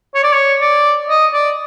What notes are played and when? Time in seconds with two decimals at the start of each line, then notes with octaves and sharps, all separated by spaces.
0.15 C#5
0.23 D5
0.33 C#5
0.61 D5
1.09 D#5
1.33 D5